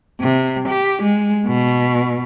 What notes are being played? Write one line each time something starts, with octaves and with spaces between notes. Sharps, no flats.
C3
G4
G#3
B2